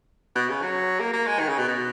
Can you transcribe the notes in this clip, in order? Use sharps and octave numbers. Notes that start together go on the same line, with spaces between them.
B2
C#3
F#3
A#3
A#3
G#3
D#3
C#3
B2
B2